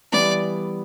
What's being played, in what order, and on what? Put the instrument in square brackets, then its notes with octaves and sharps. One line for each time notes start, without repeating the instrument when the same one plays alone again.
[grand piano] E3 G3 B3 E4 [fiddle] D5